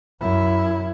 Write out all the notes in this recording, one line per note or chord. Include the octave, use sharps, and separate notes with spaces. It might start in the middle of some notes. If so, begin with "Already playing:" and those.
F#2 E4